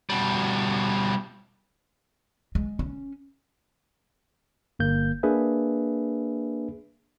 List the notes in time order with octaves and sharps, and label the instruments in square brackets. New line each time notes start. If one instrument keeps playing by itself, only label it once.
[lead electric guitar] B2 G3
[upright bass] G#3
C#4
[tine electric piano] G1 A#3 G6
A#3 D4 G#4 B4 E5